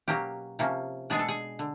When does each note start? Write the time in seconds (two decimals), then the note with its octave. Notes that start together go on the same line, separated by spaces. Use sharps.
0.08 B2 F#3 A#3 C#4 G4
0.59 C3 F3 A#3 C#4
1.10 B2 G#3 B3 D4 G#4
1.19 A4
1.28 G#4
1.59 D3